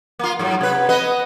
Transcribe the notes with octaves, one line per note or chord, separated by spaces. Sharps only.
A#3 F4
G#2 F#3
C3 B4
B3 B4 D#5